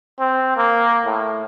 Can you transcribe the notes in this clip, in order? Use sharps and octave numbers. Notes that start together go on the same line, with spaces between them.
C4
A#3
A2